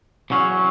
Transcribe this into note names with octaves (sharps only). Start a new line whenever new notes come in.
E2 C#3 F#3 C#4